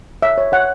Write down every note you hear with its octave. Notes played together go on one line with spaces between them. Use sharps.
C#5 E5
C#5
C#5 F#5